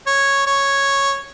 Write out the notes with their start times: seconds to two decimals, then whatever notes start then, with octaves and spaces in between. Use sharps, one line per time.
0.07 C#5
0.47 C#5